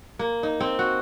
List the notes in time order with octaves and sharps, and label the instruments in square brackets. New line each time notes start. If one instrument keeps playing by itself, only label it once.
[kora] A#3
D#4
C4
F#4